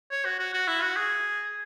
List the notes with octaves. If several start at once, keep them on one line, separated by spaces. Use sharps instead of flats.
C#5
F#4
F#4
F#4
E4
F#4
G#4